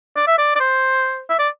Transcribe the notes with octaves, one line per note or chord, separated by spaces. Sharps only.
D5
E5
D5
D5
C5
E5
D5